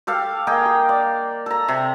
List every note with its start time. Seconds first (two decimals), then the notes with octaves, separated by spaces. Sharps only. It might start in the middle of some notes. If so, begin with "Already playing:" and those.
0.07 G4 A4 F5
0.47 A#3 G#4 D#5 G5
0.65 G4
0.89 D5
1.46 A4 A#5
1.68 C3